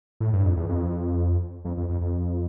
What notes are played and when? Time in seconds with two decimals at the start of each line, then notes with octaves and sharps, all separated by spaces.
0.20 A2
0.33 G2
0.45 F2
0.57 E2
0.69 F2
1.65 F2
1.77 F2
1.89 F2
2.01 F2